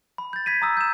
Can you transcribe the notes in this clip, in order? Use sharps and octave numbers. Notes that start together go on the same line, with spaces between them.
B5
G6 A6
B5 G#6 B6 D#7
A#5 D#6 E6
G6 E7